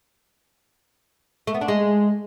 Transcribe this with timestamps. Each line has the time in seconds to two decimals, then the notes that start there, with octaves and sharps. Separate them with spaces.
1.47 A3
1.54 B3
1.61 D4
1.68 G#3